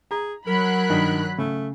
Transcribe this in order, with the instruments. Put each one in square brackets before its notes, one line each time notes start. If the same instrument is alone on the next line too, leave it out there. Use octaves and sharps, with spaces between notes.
[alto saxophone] G#4 [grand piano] A#5
[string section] F#3 B5 F#6 [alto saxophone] A#4
[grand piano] G2 D#3
[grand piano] C#3 [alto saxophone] A3